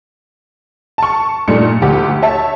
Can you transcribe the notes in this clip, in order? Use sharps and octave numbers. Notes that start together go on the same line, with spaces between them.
A5 C#6
A#2 G3 A3 D4 D#4 C#7
D2 G4
C#5 E5 A5